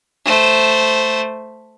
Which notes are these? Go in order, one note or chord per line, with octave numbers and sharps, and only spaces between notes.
A3 C5